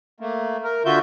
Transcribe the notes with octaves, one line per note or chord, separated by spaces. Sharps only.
A3 A#3
A#4
D3 F4 F#4 E5 G6